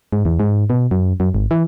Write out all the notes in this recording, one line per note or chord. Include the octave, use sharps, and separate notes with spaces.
G#2
E2
G#2
B2
F#2
F#2
G#1
E3